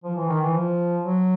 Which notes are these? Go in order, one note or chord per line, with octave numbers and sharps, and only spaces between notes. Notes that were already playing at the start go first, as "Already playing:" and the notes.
F3
E3
D#3
E3
F3
F#3